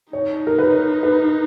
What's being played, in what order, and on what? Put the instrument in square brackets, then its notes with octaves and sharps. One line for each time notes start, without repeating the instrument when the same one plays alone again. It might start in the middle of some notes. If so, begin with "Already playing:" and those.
[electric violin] D#4 [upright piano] C#5
[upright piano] A#4
B4
B4